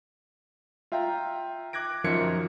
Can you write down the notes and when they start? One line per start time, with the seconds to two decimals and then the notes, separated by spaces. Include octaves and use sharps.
0.92 F4 E5 F5 G5 A#5
1.73 D6 F#6 G#6 A#6 D7
2.04 F#2 D#3 F3 A#4 G#6 C#7